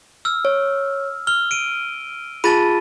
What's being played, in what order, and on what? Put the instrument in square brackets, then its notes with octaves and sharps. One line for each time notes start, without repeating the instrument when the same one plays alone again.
[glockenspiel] E6 F6
[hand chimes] C#5
[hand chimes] F6 [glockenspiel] G7
[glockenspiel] D7 D#7
[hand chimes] F4 G#4 B5 [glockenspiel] A5 A6 D#7